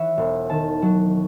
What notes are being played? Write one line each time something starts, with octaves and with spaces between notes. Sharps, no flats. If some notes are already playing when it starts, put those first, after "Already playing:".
Already playing: E3 C#5 E5 F#5
E1
D#3 A5
F#3